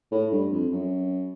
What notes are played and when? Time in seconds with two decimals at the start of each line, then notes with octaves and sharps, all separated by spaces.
0.12 A2
0.32 G2
0.52 F2
0.71 F#2